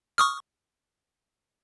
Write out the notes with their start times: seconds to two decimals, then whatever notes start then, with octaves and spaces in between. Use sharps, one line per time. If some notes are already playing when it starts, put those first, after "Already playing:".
0.18 C#6 D#6 F6